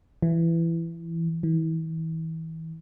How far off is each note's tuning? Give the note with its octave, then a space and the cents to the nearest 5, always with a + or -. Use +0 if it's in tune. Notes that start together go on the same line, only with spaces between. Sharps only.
E3 +15
E3 -35